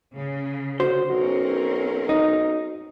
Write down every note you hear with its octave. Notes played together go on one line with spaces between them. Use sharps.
C#3
D3 F#4 C5
B1 C4 C#4 F#4 A#4
D#4